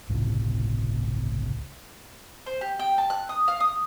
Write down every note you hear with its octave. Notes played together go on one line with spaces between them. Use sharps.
G1 C#2 A2 C3
C5
G4
G5
A5
F#6
D#6
F5
D#6